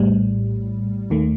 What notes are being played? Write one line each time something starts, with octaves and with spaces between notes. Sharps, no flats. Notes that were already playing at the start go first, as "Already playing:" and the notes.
Already playing: A#1 A2 G3
D#2 D#3 A3